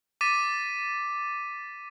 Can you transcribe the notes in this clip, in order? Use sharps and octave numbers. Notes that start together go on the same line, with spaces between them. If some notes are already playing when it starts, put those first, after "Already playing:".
D6 A6 B6 D#7